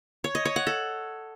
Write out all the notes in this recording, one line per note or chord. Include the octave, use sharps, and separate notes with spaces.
C#5
D#5
C#5
F#5
A4